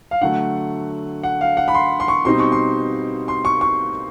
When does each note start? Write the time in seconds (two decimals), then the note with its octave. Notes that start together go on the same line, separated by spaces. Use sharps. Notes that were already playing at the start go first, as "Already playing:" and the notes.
0.11 F5
0.21 D3 F#3 A3 F#5
1.23 F#5
1.41 F5
1.57 F#5
1.68 B5
1.74 C6
2.00 C6
2.08 C#6
2.25 B2 G3 C4 D#4 C6
2.39 C#6
2.52 C6
3.28 C6
3.45 C#6
3.61 C#6